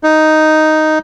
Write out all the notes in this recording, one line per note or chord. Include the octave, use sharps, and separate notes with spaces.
D#4